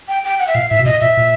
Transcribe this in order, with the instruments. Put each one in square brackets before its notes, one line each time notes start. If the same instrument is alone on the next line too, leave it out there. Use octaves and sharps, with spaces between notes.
[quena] G5
G5
F#5
E5
[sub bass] A#2 [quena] F5
[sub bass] A2 [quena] E5
[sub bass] B2
[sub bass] A#2 [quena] D#5
[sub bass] A#2 [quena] E5
[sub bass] A#2